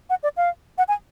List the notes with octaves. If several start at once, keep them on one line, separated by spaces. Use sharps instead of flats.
F#5
D5
F5
F#5
G#5